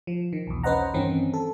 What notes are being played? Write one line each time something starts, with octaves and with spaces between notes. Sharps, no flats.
F3
D#3
B1 E2
C#4 B4 C5 D#5 F#5 A#5
G2 D#3 E3 C4 C#4
A4